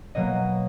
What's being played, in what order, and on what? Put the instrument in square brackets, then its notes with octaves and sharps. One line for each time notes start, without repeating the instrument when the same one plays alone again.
[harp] B2 F#3 A#3 D#5